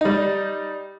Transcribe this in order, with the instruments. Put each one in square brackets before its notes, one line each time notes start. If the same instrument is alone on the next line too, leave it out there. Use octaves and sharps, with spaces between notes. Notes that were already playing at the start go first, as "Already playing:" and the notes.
[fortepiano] G3 D#4